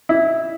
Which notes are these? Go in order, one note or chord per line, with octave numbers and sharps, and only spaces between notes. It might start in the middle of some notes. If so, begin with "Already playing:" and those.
E4